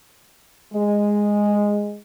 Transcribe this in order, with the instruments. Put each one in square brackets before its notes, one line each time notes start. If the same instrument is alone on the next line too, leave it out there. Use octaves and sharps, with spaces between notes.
[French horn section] G#3